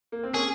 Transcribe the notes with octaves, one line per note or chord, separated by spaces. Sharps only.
A#3
C4
A#3 C#4 G#4